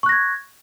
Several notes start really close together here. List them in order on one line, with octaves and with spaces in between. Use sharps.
C#6 F#6 A#6 G#6